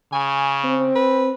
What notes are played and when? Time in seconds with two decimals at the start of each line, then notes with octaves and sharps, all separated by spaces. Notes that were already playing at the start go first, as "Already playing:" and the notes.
0.13 C#3 G#5
0.64 C4
0.95 B4